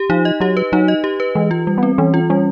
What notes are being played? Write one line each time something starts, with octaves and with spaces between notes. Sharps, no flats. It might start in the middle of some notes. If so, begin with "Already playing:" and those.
Already playing: G4
F3 D#4
D#5
F#3 G4
B4
F#3 D#4
D#5
G4
B4
E3 G#3
F4
G3
B3
C4
E3 C#4
F4
G3 C#4